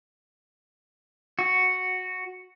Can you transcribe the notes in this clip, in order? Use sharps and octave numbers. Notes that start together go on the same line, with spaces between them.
F#4